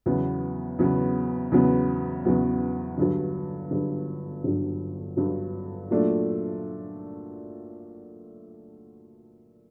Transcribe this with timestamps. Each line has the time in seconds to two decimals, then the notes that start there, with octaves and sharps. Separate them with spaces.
0.06 E2 C#3 F#3 B3
0.79 E2 C#3 F#3 B3
1.52 E2 C#3 F#3 B3
2.25 E2 C#3 F#3 B3
2.98 G1 G2 D3 F#3
3.71 G1 G2 D3 F#3
4.44 G1 G2 D3 F#3
5.17 G1 G2 D3 F#3
5.91 A#2 F#3 A3 D4 F4